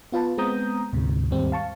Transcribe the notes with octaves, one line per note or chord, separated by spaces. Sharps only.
B3 F4 B4 A5
G#3 B3 C4 A#5 D#6 G6
D2 G#2 C3
D#2 G#2 G3 C4
F5 A5 C#6